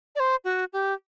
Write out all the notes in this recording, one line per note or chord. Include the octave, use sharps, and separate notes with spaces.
D5
C5
F#4
G4